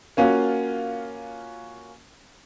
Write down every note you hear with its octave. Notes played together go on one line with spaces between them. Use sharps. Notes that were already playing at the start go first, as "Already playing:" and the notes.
A#3 C#4 F4 F#4